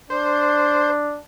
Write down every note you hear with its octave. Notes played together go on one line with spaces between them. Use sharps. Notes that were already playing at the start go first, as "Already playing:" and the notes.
D4 C5